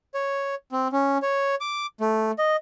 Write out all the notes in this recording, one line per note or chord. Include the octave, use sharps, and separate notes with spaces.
C#5
C4
C#4
C#5
D6
A3
D#5